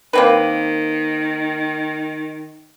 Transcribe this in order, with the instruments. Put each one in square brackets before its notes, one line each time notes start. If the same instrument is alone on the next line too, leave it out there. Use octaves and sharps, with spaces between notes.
[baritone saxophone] D#3 [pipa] A#3 C4 B4